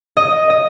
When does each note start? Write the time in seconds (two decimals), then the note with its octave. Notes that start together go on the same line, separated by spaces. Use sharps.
0.17 D#5
0.50 D#5